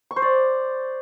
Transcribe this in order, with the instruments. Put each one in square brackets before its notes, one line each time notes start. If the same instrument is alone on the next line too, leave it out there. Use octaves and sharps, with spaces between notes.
[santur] C#6
C5
D5